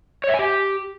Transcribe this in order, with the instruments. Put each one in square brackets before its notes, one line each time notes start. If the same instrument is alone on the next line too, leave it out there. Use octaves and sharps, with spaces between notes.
[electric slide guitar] C#5
E5
G#5
G4